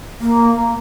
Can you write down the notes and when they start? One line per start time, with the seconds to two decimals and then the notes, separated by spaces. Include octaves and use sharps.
0.20 A#3